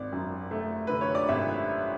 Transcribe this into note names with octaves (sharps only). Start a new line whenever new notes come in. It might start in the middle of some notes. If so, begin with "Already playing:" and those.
Already playing: G#1 D5
F#2
A3
D3 B4
C#5
D5
G#1 E5